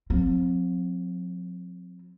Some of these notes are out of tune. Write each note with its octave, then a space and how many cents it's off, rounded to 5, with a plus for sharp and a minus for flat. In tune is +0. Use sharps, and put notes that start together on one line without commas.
F3 +45 C4 +0